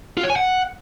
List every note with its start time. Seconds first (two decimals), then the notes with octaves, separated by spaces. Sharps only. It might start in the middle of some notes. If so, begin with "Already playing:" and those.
0.17 F4
0.24 C#5
0.30 G#5
0.36 F#5